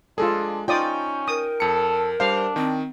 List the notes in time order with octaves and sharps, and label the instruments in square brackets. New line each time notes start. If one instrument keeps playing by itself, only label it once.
[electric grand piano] G#3 G#4 [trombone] D4 [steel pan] F4 A4
[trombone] C#4 [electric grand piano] D#4 G5 [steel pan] F4 D5 D#6
[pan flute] A#4 [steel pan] D#6
[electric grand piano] F2 C#7 [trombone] A4
[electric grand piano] G3 C5 [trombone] D4 [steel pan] F5
[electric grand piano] D#3 [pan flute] C4